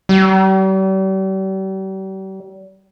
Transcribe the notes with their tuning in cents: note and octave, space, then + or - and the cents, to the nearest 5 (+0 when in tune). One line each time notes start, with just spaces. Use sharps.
G3 -40